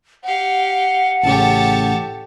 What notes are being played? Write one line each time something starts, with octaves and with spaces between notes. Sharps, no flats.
G4 F5 F#5
A1 A2 C#3 G4 A4 C#5 A5